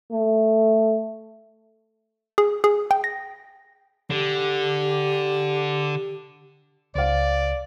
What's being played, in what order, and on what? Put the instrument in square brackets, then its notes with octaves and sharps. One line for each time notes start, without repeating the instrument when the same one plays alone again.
[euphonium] A3
[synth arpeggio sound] G#4
G#4
G5
A#6
[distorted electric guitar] D3 [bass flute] G4
[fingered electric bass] C#2 [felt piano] C5 F5 [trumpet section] D5